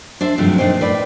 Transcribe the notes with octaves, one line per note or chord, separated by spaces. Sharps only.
D4 C5 E5
G2 C3 D#3 F3 F#3 A3
A#2 D4 D#4 C5 G5
A2 B4 D5